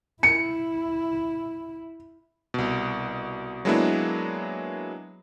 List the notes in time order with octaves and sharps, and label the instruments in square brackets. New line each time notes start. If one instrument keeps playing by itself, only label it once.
[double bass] E4 [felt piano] C#7
[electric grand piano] C2 B2
F#3 G#3 A#3 B3 D4 E4